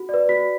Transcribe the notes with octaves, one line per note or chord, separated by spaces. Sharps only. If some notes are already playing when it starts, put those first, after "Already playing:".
Already playing: F#4
B4 D5
F#4 B6